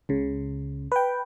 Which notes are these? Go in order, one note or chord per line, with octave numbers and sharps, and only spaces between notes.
C#2 C#3
B4 G5